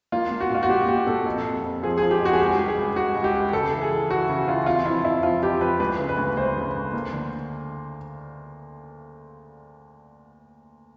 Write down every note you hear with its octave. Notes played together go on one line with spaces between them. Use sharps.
A#3 F4
A#3
F#4
A#2 F4
F#4
A#2 G4
A#2 G4
A#2 A4
F2
F2
F2
F3 G#4
F3 G#4
G4
F2
F#4
G#4
C#2 G4
G3
G#4
C#2
C#2 F#4
C#2
G4
C#2
C#3 A4
E3
G#4
E3
E3 F#4
C#3
E3 F4
C3 F4
F3 E4
F2 E4
F3 F4
F2 G4
F3 B4
D2 B4
C#3
B4
D2
D2 C5
C#3
D2
A#3
D3